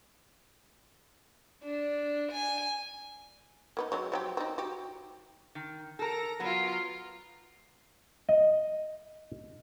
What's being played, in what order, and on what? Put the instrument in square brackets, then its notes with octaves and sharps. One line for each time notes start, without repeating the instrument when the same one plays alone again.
[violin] D4
G#5
[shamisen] A#3 B3 D#4
F#3 G#3 C#4
F3 F#3 G4
C4 D#4
F#4 G4
[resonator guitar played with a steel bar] D#3
[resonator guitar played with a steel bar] A4 A#4 [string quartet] A#5 A#6
[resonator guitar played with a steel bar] F#3 B3 B4 [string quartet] F4 A#4
[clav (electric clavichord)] D#5